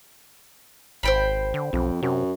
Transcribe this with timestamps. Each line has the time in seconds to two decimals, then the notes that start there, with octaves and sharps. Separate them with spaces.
1.03 G#1 C5 G5 B5
1.54 D3
1.73 B1 F2
2.02 F#2 C3